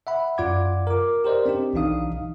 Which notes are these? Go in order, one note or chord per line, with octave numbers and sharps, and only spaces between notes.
E5 F#5 B5
F#2 F4 D5 F#5 D6 G#6
A#4 D6
G4 A#4 C5 D5 D#5
C4 D4 G4
B1 E3 D4 D#4 F5 D#6